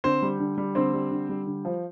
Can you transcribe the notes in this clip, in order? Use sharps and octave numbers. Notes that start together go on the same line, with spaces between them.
D3 C4 C5
G3
D3
G3
D3 C4 C5
G3
D3
G3
D3
F3